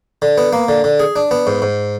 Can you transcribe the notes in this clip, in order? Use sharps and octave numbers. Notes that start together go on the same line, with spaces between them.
D3
B3
A#3
D3
D3
G#4
D4
B3
G#2
G#2